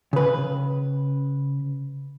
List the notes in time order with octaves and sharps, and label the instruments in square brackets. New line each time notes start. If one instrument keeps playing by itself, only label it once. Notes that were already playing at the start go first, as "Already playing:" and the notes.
[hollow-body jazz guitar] C#3 B4